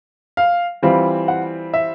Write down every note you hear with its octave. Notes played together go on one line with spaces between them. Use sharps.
F5
E3 G3 C4 F4
F#5
E5